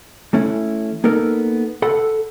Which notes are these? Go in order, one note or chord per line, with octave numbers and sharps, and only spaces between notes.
E3 A3 C#4 E4
A#3 B3 D#4 A4 A#4
A4 F#5 B5